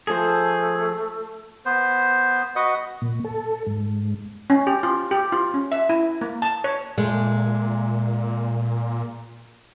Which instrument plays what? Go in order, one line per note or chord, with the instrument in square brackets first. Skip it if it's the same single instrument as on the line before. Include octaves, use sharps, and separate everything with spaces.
[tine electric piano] F3 A4 [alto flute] A3 [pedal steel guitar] G#4 C5
[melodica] B3 C5
F#4 B4 D#5 F#5
[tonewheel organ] A#2
A4
G#2
[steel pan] C#4
G4
F4
G4
F4
C#4
E5
E4
A#3
A5
C#5
[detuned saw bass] A#2 [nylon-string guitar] G#3 A3